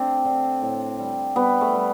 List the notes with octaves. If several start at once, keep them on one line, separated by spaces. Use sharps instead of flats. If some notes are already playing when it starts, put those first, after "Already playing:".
Already playing: A3 C4 D4
D3
A2
G3
G3 B3
A3
G3